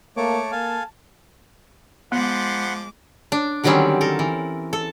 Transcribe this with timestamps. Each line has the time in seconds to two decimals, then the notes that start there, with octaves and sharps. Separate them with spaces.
0.17 A3 A#3 C#5 A5 D6
0.52 A#3 A4 F5 G#5
2.12 F3 G#3 B3 F#5 B5 C6 D6
3.32 D4
3.64 D3 D#3 F#3 G3 C4 C#4
4.01 A4 A#4
4.19 E3
4.73 A4